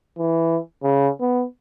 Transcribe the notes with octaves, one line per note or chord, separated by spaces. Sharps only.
E3
C#3
B3